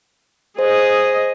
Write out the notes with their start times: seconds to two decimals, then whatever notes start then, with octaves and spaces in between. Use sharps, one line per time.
0.59 G#4 C5 D#5